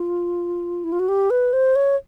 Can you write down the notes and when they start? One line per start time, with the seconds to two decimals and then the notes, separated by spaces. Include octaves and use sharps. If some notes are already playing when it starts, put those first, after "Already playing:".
Already playing: F4
0.84 E4
0.92 F4
0.99 F#4
1.08 G4
1.30 B4
1.53 C5
1.76 C#5